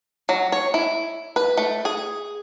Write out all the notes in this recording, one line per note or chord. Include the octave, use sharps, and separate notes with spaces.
F#3
C#5
E4
B4
A3
G#4